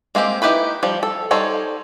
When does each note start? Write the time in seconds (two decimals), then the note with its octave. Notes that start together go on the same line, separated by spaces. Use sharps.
0.15 G#3 A#3 C4 G4
0.42 D#4 E4 G4 B4 B5
0.83 F3 G3
1.03 A4
1.31 G3 D#4 A4 C5 C#5